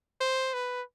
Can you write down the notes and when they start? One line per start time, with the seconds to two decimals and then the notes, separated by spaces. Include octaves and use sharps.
0.21 C5
0.54 B4